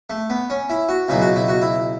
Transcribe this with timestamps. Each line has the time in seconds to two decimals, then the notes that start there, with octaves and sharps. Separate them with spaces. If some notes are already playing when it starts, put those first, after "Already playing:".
0.10 A3
0.30 B3
0.50 C#4
0.70 E4
0.89 F#4
1.09 C#2 B2 F#3 E4
1.22 F#4
1.36 E4
1.48 F#4
1.62 E4